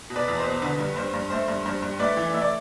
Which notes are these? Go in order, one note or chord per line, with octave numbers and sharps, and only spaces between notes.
B2
B4 D5
E2
C5
B2
D3 B4
G2
G2 C5
G2
A3 C5
G2
G2 C5
G2
A3 B4 D5
E3
A3 E5
D5